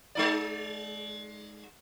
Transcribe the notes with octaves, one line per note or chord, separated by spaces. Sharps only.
G#3 D#4 D5